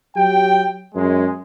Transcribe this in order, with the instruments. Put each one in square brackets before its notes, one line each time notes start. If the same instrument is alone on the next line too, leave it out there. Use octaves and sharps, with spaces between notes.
[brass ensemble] F#3 G4 G5
F#2 G#3